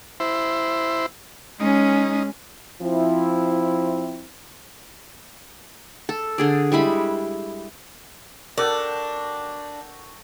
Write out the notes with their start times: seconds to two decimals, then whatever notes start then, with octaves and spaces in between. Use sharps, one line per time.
0.20 E4 C5
1.60 G#3 C#4 D#4
2.82 F3 C4 E4
6.09 A4
6.38 D3 G#4 D5
6.72 G3 G#3 E4 B5
8.58 D4 F#4 A4 A#4 G5